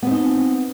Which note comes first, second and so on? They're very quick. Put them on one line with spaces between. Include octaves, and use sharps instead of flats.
B3 C4 D#4